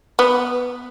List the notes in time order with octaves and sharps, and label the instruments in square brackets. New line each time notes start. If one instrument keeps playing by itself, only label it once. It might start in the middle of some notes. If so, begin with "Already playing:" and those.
[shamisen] B3